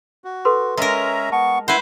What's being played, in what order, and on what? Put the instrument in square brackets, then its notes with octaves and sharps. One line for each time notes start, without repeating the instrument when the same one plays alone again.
[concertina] F#4
[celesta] A4 B4 C6
[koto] G#3 A#4 [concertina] C#4 E5 A#5
[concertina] B3 C#6 [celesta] A5
[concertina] E4 F#5 [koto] B4 C5